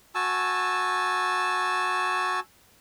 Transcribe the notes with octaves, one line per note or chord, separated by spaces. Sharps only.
F#4 G#5 A5 E6